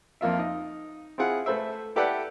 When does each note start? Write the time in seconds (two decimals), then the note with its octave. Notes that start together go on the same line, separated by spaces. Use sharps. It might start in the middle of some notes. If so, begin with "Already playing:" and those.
0.21 F2 A#3 F4 E5
0.39 D#4 D#5
1.18 C4 E4 F4 G#4 F#5
1.46 A3 B4 C5 E5
1.96 E4 G4 A4 B4 D5 F#5